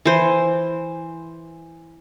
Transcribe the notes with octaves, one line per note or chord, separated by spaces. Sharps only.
E3 C5